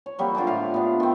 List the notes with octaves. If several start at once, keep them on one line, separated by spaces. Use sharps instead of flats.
C#5
F#3 G3 A#3 C4
D3 F4 A4 D6
A2 E4 F4 F5
B3 D4
D#3 C4